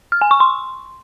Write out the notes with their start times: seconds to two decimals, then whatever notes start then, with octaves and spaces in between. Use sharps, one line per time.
0.12 F6
0.21 G#5
0.31 C#6
0.40 C6